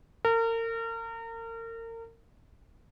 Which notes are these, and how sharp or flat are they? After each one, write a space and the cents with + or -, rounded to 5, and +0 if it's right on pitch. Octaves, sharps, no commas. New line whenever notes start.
A#4 -35